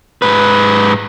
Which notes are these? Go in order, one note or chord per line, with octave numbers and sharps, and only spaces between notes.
G#2 B4